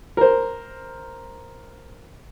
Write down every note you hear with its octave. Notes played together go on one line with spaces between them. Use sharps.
A#4 C5